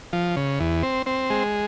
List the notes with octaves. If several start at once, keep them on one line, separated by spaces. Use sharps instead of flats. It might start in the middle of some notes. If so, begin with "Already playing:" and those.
F3
C#3
E2
C4
C4
G#3